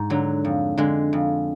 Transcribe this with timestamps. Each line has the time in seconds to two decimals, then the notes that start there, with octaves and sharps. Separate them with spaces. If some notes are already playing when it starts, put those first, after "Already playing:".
Already playing: G#2
0.10 D3 F#3
0.45 F2
0.77 D3 G#3
1.13 F2